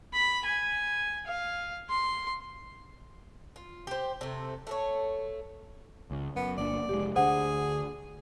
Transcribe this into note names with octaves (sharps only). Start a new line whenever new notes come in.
B5
G#5
F5
C6
F4
G4 C5
C3 A3
A3 A4 C#5
C#2
F#2 B3
G1 A#3 D4 D5
F1 G#3 G4
D2 D3 D4 G#4 C5 F#5